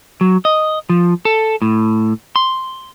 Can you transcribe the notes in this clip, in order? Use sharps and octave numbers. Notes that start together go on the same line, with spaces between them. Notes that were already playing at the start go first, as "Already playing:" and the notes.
F#3
D#5
F3
A4
A2
C6